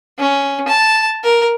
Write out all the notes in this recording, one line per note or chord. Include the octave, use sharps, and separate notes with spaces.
C#4
A5
A#4